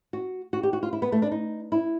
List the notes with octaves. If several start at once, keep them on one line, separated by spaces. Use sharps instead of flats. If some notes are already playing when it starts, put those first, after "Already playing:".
F#4
F#4
G4
F#4
F4
E4
B3
A3
D4
D#4
E4